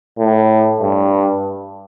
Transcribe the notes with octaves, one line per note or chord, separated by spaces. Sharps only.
A2
G2